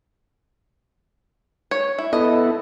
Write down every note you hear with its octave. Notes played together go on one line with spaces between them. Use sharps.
C#5
E4
B3 E4 A4 D#5